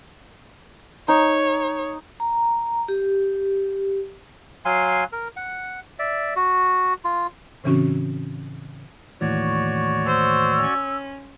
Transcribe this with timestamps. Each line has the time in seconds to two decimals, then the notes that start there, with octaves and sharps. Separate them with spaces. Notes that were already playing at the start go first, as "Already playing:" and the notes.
1.08 D#4 C#5
2.20 A#5
2.88 G4
4.65 F#3 F5 G#5 C6
5.12 A#4
5.36 F#5
5.99 D5 E5
6.36 F#4
7.04 F4
7.64 A2 C#3 E3 C4 C#4 F#4
9.21 D#2 A2 E3 F#4 C#5 D5
10.06 C5 E6
10.62 C#4